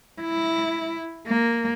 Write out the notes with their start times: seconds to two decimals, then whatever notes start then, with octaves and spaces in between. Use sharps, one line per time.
0.21 E4
1.27 A#3